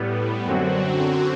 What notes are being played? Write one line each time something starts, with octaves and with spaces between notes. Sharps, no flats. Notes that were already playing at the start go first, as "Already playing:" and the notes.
Already playing: A2 G3 B3
F#2 D3 F#3 C4 F#4